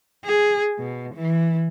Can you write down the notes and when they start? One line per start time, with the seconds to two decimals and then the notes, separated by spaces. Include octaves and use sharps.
0.25 G#4
0.79 B2
1.15 E3